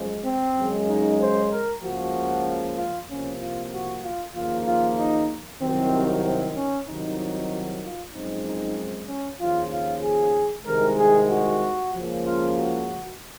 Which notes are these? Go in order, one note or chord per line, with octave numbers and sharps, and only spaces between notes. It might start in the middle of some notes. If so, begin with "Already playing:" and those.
Already playing: F#2 F3 G#3
C4
F#2 C#3 G#3
D#4
C5
A#4
C#2 C#3 F3 A#3 F#4
F4
C2 C3 F3 A#3 C#4
F4
F#4
F4
D#2 C#3 F3 A#3 F4
F4
D#4
C2 C3 D#3 F#3 C4
C4
C#4
C2 C3 D#3 F#3 D#4
F4
F#2 F3 G#3 C4 D#4
D#4
C#4
D#2 C#3 F3 F4
F4
G#4
C2 C3 D#3 G#3 A#4
G#4
F#4
C#2 C#3 F3 A#3
F4
F#4